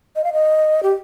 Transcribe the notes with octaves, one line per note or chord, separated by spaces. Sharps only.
D#5
F5
D#5
G4